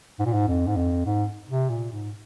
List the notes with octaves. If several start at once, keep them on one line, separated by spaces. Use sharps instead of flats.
G#2
A#2
G#2
F2
G#2
F2
G#2
C3
A#2
G#2